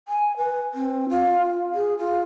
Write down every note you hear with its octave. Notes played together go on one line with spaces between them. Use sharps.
G#5
B4
C4
F4
G#4
F4